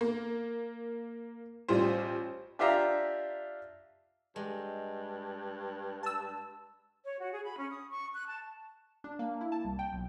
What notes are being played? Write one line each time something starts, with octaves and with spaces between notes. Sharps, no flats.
A#3
A1 G3 F4 C5
D4 F4 G4 E5 F5 A#5
G2 G#3
A5 E6
C#5
F#4
G#4
B5
C#4
D#6
C#6
F#6
A5
D4
A#3
E4
A5
C2
G5
B1